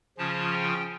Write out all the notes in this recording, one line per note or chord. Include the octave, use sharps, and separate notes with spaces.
C#3 F3 C#4 F4 A5
G5